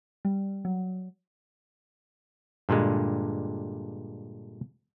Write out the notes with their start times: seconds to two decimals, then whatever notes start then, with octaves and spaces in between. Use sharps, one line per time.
0.25 G3
0.65 F#3
2.69 G2 A#2 D3 G#3